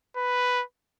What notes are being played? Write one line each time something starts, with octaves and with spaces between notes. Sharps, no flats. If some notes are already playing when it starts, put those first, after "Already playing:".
B4